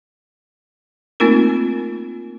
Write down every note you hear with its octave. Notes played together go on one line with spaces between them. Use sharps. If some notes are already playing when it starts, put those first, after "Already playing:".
A3 A#3 C4 D#4 F4 A#4